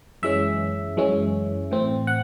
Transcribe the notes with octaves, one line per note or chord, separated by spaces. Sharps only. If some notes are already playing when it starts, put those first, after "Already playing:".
F#2 E3 G#3 C#4 E5
F#2 E3 G#3 C#4
A2 E3 C4
F#5